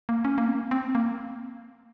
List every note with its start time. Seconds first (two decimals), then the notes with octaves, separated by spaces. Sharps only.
0.09 A#3
0.25 C#4
0.38 A#3
0.48 C4
0.71 C4
0.95 A#3